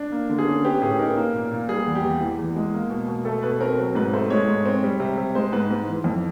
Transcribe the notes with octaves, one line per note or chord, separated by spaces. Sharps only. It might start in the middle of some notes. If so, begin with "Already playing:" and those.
Already playing: D4
A#3
D3
G#4
C#4
B3 G4
A2 G#4
D#4 A#4
A#3
A#2
A#2
G3 G#4
E2
G4
E2
E3
E2
G#3
A#3
B2
B2
A3 A4
B2 B4
C4 A#4
F#3
G#2 B4
A3 C5
G#3 C#5
G#2
C4
G3
C3
C3
G#3 C5
G#2 B4
G#2
E3
F2